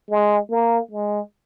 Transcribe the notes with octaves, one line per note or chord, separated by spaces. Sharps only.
G#3
A#3
G#3